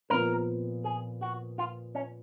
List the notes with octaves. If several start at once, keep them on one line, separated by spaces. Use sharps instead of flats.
A#2 F3 B3 A#4
G#4
F#4
F4
C#4